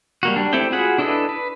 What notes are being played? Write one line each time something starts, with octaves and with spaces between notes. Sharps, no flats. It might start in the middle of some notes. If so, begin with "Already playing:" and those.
G3 A#3 F#4
G3 D4
A3 C4 E4 G4 G5
F4 F#4 G#4 F#5 B5
D4 E4 A4 B4 D#5
B4